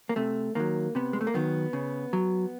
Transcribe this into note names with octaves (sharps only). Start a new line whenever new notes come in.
A#3
C3 A3
D#3 F#3 A#3
C3 B3
G#3
A3
A#3
D#3 F#3 B3
C#3
F#3